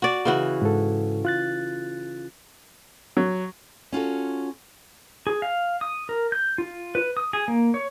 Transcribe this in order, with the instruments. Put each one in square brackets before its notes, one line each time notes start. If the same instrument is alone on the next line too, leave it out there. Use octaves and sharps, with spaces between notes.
[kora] F#4 D5
C#3 E3 F#4
[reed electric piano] G#2 A4
F4 F#6 A6
[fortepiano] F#3
[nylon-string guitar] C#4 F4 F#4 A4
[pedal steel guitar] G#4
F5
D#6
A#4
G6
F4
B4
D#6
G#4
A#3
C#5